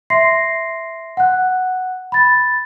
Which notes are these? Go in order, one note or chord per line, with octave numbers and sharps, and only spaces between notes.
E5 C6 A#6 C7
F#5 F#6
B5 A6